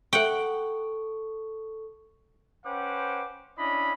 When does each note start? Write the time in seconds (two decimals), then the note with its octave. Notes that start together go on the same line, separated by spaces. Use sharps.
0.13 A4 F#5 G5 C#6
2.65 C#4 B4 C5 F#5 G5 D6
3.58 C#4 D4 E4 D#5 B5